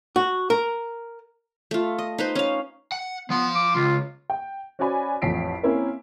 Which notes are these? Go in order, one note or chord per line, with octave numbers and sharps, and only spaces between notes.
F#4
A#4
A3 F4
D#5
D#4 B4 C5
C#4 F5
F#5
F3 B3 C6
D6
C#2 F4
G5
C#4 F#4 C5 D5 G#5 B5
A1 F2 B6 C7 D7
A#3 C4 C#4 E4 A#4